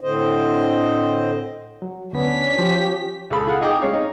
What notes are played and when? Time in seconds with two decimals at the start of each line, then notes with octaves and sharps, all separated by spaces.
0.01 A2 D3 C4 C5 D#5
1.82 F#3
2.13 D2 B3 C#4 D4 B6
2.59 F3 G4
3.30 C#2 G#4 A4 B5
3.47 F4 G#4 F5 F#5
3.61 D#4 G#4 D#5 G5 D6
3.81 G#3 C#4 C#5 F5
3.93 D#4